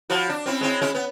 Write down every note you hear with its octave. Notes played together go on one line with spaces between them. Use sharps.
F3 E4 F#4
D4
C4 C#4 E4
G#3 C4 E4
G#3 C#4 E4
B3